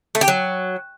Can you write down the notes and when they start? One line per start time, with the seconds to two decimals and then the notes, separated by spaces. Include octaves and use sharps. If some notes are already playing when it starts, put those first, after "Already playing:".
0.15 A3
0.21 G4
0.28 F#3